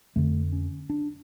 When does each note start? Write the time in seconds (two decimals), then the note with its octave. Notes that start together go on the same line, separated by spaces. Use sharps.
0.16 F2 D3 A3
0.53 C#4
0.90 D4